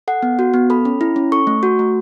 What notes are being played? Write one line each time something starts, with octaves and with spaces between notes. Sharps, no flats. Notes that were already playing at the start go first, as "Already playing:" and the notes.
A4 F#5
B3
F#4
B3
A4 B5
C#4
E4
C#4
A4 C#6
A3
F#4
A3